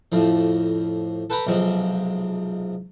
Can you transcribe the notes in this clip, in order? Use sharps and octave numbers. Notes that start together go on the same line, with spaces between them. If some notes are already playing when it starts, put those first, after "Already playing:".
F2 A2 F3
A4 B4 G5 A#5 B5
B1 C3 F3 G#3